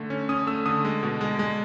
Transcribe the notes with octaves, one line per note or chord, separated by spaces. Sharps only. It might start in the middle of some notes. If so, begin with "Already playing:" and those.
Already playing: D3 A3
C#4
C#4 D#6
A3 E6
D3 D#6
G#3
B2
G#3
G#3